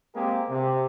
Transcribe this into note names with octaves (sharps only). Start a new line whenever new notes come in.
G#3 A#3 C4 G4 G#4 A#4
C3